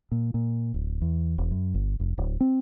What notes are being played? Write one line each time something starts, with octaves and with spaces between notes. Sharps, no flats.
A#2
A#2
D1
E2
E1
F#2
G1
F1
D1
C4